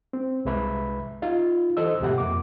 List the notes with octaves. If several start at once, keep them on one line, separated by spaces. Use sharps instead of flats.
C4
C2 G#3 B4 E5 B5
D#4 F4 F5
E3 A4 C5 D#5 E6
D2 G#2 B2 G4 E5 F#5
F2 A#3 D6